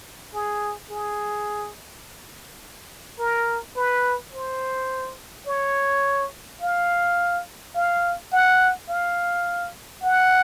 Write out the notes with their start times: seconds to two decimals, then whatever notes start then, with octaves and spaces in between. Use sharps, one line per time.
0.34 G#4
0.91 G#4
3.19 A#4
3.76 B4
4.33 C5
5.47 C#5
6.61 F5
7.75 F5
8.32 F#5
8.89 F5
10.03 F#5